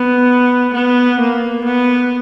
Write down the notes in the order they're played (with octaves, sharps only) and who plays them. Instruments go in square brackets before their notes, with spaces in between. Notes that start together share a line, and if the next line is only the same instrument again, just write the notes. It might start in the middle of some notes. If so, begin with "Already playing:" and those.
Already playing: [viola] B3
B3
A#3
B3